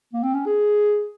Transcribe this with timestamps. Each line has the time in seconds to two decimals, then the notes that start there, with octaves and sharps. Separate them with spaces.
0.13 A#3
0.23 C4
0.34 C#4
0.46 G#4